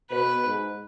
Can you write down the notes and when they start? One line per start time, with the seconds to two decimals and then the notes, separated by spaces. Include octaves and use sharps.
0.11 B2 B4
0.45 G#2